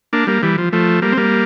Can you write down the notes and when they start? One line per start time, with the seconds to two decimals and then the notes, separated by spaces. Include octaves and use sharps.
0.13 A#3 D4
0.27 G3 A#3
0.43 E3 G3
0.58 F3
0.73 F3 A3
1.02 G3 A#3
1.12 C4
1.17 G3 A#3